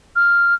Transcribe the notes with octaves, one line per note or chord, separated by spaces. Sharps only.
F6